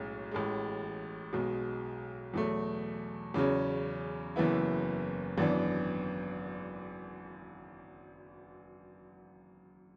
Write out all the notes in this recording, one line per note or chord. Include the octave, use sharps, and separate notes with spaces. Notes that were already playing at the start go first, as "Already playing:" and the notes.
Already playing: B1 A2 G#3 C#4
A1 A2 G#3
B1 B2 G#3
E2 B2 F#3 A3
E2 C#3 F#3 C#4
F#1 F#2 E3 B3 E4
G#1 F#2 E3 B3 D4